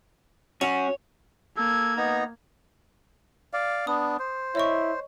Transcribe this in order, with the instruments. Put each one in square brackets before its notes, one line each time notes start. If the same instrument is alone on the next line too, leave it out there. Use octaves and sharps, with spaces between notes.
[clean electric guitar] C#4 F#4 [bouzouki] C#5
[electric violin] A#3 G#6 [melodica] A4
[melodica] B3 D#4 A#5
D5 F5
[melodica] B3 D4 [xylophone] D#6
[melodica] C5
[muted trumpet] E4 [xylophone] C#5 D#5 C#6